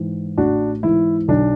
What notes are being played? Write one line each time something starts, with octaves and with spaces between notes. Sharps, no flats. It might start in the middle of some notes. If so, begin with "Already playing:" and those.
Already playing: G#2 E3
A1 D4 F#4
G#2 E3 E4
B1 D4